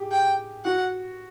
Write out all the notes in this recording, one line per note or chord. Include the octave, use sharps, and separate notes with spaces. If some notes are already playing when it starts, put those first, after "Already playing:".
Already playing: G4 G#4
G5
F#4 F#5